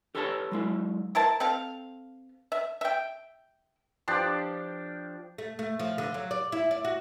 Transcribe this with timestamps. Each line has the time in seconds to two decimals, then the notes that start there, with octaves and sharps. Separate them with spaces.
0.15 G4 A4 B4 C#5 E5 A5
0.52 F#3 G#3 E4
1.15 E4 A#4 C5 A5
1.40 C4 A4 F5
2.52 E5
2.81 E5 G5
4.08 F3 D4 G4 D5
5.38 A3
5.59 A3
5.80 F3
5.98 D3
6.14 F#3
6.31 D5
6.52 E4
6.71 D5
6.85 F#4